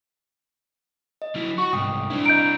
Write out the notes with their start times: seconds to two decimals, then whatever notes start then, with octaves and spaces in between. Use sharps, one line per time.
1.22 D#5
1.35 F#3 E4
1.58 F#4 F#5 C#6
1.73 C2 G#2 G5 D#6
2.10 C4 D4 E4
2.26 D#5 A#5 G6 D7